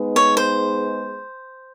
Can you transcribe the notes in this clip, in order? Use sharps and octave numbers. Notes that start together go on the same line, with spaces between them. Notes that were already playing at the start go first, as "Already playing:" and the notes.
Already playing: G#3 B3 D#4 G#4 B4
C#5
C5